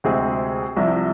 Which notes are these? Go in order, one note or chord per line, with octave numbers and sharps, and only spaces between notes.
D2 C3 G#3 C4 G#4
C2 C3 F3